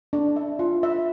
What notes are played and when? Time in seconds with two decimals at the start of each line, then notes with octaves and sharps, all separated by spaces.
0.13 D4
0.36 E5
0.59 F4
0.83 E5